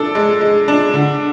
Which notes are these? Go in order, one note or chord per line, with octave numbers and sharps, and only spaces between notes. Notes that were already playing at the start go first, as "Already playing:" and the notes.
Already playing: D4 A4
G#3
G#3
D4
D3